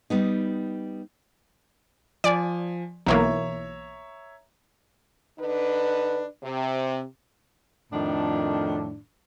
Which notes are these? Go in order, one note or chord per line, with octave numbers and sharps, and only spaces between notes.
G3 B3 D#4
F3 D5 G#5
B1 E3 A#3 C#5 E5 A#5
D3 D4 D#4 B4
C3
F2 A2 D#3 D4